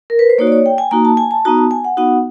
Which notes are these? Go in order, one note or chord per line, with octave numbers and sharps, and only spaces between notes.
A#4
B4
C5
A#3 D#4 F#4 C#5
D5
C#5
G5
G#5
A#3 D#4 F#4 A#5
A5
G#5
A5
B3 D#4 F#4 A#5
A5
G#5
F#5
B3 D#4 F#4 F#5